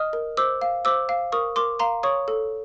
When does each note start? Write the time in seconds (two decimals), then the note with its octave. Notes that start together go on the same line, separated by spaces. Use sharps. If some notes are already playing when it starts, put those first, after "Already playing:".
Already playing: D#5 D#6 F6
0.13 A#4
0.37 C5 D6 E6
0.62 F5
0.85 C5 D6 E6
1.09 F5
1.32 A#4 C#6 D#6
1.56 A#4 C6 D6
1.79 F5 A#5 C6
2.03 C#5 C#6 D#6
2.28 A4